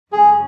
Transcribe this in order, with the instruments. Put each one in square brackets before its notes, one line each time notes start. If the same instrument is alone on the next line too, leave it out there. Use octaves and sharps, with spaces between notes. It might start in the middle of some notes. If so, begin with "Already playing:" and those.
[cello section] F#2 C#3 G#3 C#4 [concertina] G#4